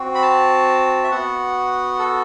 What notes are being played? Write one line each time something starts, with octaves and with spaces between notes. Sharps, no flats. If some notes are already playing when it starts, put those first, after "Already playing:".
Already playing: C4 F#4
B5
A5
E5
B3 F#4 F#5
A4